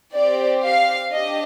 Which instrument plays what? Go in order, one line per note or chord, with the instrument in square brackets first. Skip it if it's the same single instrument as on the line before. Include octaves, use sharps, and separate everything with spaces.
[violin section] C4 G4 D5
F5
D4 G4 D#5